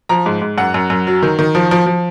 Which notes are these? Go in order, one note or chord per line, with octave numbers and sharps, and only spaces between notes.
F3 A#5
G#2
G#2
F#2 F#5
F#2
F#2
F#3
D#3
D#3
F3
F3
F3